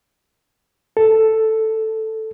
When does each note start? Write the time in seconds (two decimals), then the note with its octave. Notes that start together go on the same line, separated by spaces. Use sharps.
0.97 A4